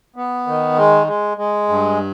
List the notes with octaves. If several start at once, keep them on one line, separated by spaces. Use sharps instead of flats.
B3
D#3
G#3
G#3
G#3
G2